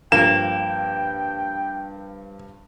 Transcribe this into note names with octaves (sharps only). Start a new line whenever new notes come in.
G2 F3 A#3 G5 E7